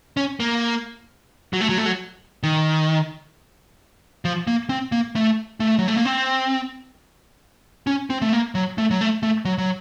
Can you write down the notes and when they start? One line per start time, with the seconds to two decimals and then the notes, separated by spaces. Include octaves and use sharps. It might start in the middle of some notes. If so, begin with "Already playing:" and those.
0.17 C#4
0.40 A#3
1.53 F#3
1.61 A3
1.69 F#3
1.78 A3
1.86 F#3
2.43 D#3
4.25 F3
4.47 A#3
4.69 C4
4.92 A#3
5.16 A3
5.60 A3
5.79 F#3
5.88 A3
5.97 A#3
6.05 C4
7.87 C#4
8.10 C4
8.22 A3
8.33 A#3
8.55 F#3
8.78 A3
8.91 F#3
9.01 A3
9.23 A3
9.45 F#3
9.58 F#3